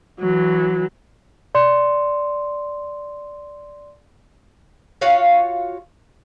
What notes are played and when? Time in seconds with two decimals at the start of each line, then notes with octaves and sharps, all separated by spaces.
0.20 E3 F#3
1.55 D5 C6
5.01 F4 F#4 C#5 F5